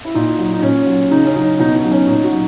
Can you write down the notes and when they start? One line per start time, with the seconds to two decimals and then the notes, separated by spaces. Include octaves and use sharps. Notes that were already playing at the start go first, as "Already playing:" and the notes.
0.05 E4
0.15 A#2 D#4
0.39 F#3
0.53 D#4
0.62 A#2 C#4
0.87 F#3
1.11 C#3 D#4
1.25 C#4
1.36 F#3 D#4
1.59 B2 D#4
1.75 D#4
1.84 F#3
1.92 C#4
2.07 A#2 D#4
2.24 F#4
2.32 F#3